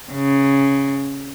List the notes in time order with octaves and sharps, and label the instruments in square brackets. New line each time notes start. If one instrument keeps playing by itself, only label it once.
[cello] C#3